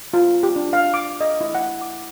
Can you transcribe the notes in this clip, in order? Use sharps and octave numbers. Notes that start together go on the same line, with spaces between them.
F4
G4
D4
F5
D6
D#5
E4
F#5
D6